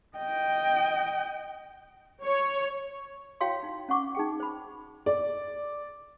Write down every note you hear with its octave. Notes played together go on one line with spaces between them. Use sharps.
D#5 G5
C#5
E4 F#4 C#5 F5 G5 C6
D#4
C#4 F#5 C#6 D6
D#4 G#4 G5
C5 B5
D5